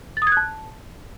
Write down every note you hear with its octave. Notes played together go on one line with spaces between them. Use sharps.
A6
D#6
G#6
F#6
A5